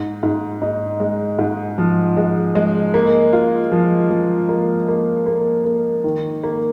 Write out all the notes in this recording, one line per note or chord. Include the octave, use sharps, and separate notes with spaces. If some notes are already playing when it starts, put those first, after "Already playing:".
Already playing: G#2
G#2
D#4
G#3
G#2
F3
G#3
G#3
A#3
F4
F3
F3
A#3
A#3
A#3
A#3
D#3
A#3